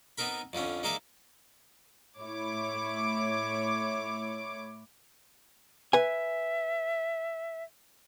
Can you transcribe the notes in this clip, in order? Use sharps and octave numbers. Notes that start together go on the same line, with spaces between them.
B3 C4 D#4 A#4 B5
F2 D3 F3 C#4
G#3 A#3 D#4 D5 E5
A2 E4 C#5 D6
B4 E5 G#5